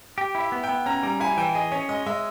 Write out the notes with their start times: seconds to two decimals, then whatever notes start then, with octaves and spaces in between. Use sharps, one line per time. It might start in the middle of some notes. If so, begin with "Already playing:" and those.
0.18 G4 G5
0.35 E4
0.40 E5
0.52 B3
0.64 G5
0.69 B3
0.86 C#4 A#5
1.03 G3 A#5
1.20 E4 G#5
1.37 E3 G5
1.55 G#4 D#5
1.72 C#4 C#5
1.89 G#3 D#5
2.06 G#3 E5